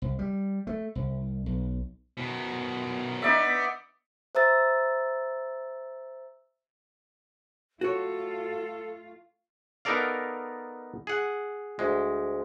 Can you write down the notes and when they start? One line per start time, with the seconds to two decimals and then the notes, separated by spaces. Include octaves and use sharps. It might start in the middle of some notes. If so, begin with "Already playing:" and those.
0.02 C2
0.19 G3
0.67 A3
0.95 C2
1.46 B1
2.17 B2 D#3
3.22 B3 D#4 D5 E5
4.35 C5 E5 A#5 E6 A6
7.81 A3 F4 F#4 A4 C#5
9.85 B3 D#4 A4 A#4 D5 F5
11.07 G#4 F#5
11.79 D2 G#3